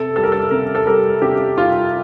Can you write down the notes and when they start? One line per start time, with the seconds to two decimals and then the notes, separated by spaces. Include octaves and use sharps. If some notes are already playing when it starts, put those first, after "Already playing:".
Already playing: C3 A4
0.16 G3 A4
0.23 A#4
0.32 A4
0.51 C3 A#4
0.75 A4
0.86 G3 A#4
1.22 C3 G4
1.57 G3 F4